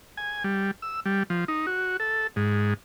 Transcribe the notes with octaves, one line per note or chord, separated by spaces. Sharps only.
G#5
G3
E6
G3
F3
D#4
F#4
A4
G#2